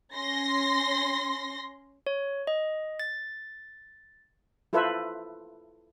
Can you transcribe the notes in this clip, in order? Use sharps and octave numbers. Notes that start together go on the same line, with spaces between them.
C#4 C6 A#6
C#5
D#5
A6
E4 F4 A4 B4 C5 E5